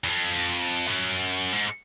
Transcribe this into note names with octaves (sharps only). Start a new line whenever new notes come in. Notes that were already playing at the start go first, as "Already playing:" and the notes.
E2
F2
F#2
G#2